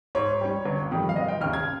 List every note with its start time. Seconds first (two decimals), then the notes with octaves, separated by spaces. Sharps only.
0.15 G#2 C#5
0.41 G3 C#4
0.66 G1
0.91 F2 D#3 G3
1.09 F5
1.16 F1 D#5
1.28 G5
1.41 D#2 C#3 F6
1.53 G#6